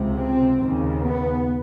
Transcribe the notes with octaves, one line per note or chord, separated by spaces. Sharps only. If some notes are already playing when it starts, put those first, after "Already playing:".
Already playing: C#2 C3
C4
D#2 C#3
B3